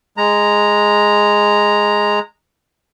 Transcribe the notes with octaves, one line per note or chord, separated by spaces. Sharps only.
G#3 A#5